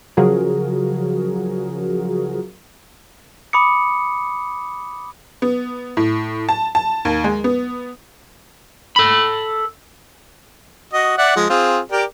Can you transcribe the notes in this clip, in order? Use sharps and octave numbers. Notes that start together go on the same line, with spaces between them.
C#3 F3 F#3 F#4 G#4 A#4
B5 D6 D#6 C#7
B3
A2
A5
A5
D#2
G#3
B3
A4 B5
F#4 D#5
D5 E5 F#5
F3 G#3
C4 F4 G#4
G4 A#4 D5